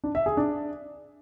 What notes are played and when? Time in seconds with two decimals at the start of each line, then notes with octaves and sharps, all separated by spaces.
0.04 D4
0.15 E5
0.26 G#4
0.37 D4